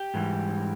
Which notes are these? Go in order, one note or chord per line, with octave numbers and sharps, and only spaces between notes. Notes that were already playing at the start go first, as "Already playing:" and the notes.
Already playing: G4
G#2 E3 G3